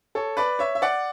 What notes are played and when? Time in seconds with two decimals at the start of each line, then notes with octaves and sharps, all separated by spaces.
0.15 A4 C#5
0.37 B4 D5
0.59 C#5 E5
0.75 E5
0.82 D5 F#5